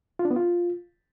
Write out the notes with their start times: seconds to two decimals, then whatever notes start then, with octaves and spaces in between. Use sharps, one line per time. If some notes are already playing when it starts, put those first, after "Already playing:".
0.19 F4
0.25 D4
0.31 B3
0.36 F4